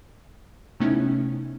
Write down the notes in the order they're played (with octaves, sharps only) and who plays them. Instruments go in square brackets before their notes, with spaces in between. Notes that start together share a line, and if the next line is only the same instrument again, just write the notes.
[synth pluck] C3 A3 B3 C#4 D#4 E4